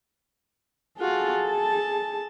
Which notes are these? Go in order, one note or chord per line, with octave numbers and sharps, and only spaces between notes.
F4 F#4 G#4 A4
A5